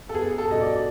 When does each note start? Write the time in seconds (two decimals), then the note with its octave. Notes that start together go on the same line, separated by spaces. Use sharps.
0.09 A4
0.15 B3 G#4
0.38 A4
0.50 B2 D#5
0.61 D5